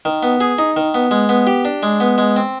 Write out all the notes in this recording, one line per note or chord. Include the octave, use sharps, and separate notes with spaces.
D#3
B3
G#4
D#4
D#3
B3
G#3
B3
G4
D4
G#3
B3
G#3
C4